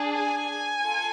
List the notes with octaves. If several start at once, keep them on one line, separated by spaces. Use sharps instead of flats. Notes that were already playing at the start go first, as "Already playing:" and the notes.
Already playing: D4 G#4
G#5
F4 A4